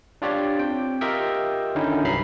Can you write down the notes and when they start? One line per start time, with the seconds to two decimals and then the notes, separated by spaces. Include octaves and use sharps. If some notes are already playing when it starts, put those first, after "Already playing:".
0.22 D4 F4 G4 C#5 D5
0.59 C4 G5
1.01 F4 G4 A#4 D#5 E5 G5
1.75 D3 D#3 C#4 D#4 E4
2.04 C2 G2 F#3 A#5 B5 C7